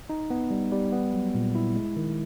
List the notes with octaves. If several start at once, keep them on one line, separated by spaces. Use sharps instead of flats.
D#4
B3
G3
G3
B3
F#3
A#2
E4
G#3
D#3